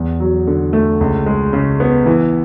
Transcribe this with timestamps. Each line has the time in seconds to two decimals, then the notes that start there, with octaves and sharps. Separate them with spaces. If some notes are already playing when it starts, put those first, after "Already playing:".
Already playing: E2
0.20 F#3
0.47 D3
0.73 A3
1.01 C#2
1.26 G#3
1.53 C#3
1.80 B3
2.06 E3